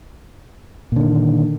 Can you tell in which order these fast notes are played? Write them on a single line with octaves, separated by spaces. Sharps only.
A#2 D3 D#3